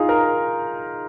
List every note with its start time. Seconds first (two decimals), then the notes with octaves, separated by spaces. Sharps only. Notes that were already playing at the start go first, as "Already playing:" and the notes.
Already playing: D#4 F4 G#4
0.09 A#4